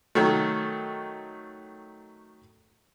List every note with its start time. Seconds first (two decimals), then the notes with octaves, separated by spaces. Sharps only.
0.15 D#3 F#3 A3